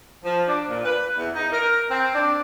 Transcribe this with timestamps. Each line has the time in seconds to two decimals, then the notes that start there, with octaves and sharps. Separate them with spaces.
0.24 F3
0.47 D4
0.69 A#2
0.84 B4
1.18 E2
1.35 D#4
1.52 A#4
1.90 C4
2.15 D4